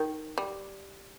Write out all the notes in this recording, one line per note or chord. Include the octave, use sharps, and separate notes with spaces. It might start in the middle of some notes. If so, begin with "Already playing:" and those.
Already playing: D#3
G3